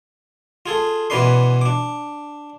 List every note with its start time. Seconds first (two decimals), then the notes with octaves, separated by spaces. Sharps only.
0.66 F4 G#4 A4
1.10 B2 E3 C#4 B4 D5 C6
1.61 D4 D6